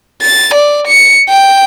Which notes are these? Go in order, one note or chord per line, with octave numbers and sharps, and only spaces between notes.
A6
D5
C#7
G5